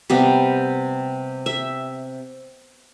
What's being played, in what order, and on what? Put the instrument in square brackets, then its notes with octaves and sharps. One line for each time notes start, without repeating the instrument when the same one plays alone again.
[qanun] C3 G3 B3
E5